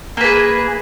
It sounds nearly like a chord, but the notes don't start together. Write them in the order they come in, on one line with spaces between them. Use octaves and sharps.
A#3 B4 G#4